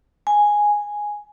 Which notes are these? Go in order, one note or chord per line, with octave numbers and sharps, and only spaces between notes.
G#5